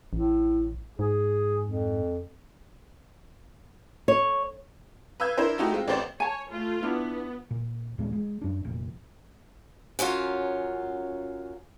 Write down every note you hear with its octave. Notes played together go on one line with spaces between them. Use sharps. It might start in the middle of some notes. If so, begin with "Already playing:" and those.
A1 A2
G#2 G#4
F2
C#5
B4 F5 E6 G6 G#6
D4 E4 A#4 C5
A3 D#4 E4 F#4 G4 A4
G#3 C4 F4
A1 C4 G4 C5 D5 A6
C#5 G#5 A5
A3 F4
B3 D4 E4
A#2
D#2 A#2 G#3 B3
G#3
F#2 D4
F1 A#2
F#2 F#3 C#4 F4